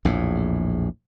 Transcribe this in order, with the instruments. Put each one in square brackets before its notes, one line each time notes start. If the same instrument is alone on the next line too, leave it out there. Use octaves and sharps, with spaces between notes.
[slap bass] A#1 E2 A2